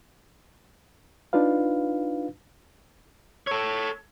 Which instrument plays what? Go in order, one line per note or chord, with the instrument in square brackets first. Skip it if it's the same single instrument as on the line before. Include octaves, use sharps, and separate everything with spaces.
[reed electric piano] D4 D#4 F4 B4 F5
[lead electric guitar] A4 C#5